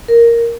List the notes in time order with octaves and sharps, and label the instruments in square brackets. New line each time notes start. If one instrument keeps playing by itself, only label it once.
[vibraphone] A#4